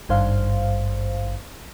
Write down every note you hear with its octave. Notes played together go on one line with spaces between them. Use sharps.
G#1 G2 C5 F5